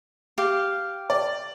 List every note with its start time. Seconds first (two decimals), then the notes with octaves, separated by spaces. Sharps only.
0.38 G4 F5
1.10 D5